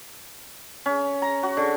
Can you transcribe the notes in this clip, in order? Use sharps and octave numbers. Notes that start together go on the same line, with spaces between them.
C#4
A#5
F#4
D3